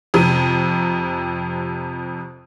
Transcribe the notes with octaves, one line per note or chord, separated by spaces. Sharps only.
F2 C3